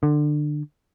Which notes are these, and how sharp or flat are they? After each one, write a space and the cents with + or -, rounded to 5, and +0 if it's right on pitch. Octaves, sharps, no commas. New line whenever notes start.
D3 +25